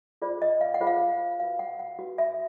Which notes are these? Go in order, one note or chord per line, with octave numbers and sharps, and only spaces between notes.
F4 G#4 C5 D5
D#5
F5
F#5
F4 G#4 C5
F5
F#4 B4 F5
F#5
F#5
F#4 B4
E5